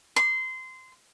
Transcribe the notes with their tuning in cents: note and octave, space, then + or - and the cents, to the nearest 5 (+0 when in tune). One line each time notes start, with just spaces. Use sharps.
C6 -20